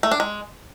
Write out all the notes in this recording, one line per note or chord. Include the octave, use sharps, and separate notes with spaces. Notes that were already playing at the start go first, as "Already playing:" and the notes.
A3
D4
G#3